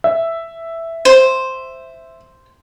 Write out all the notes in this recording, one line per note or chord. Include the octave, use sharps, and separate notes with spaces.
E5
C5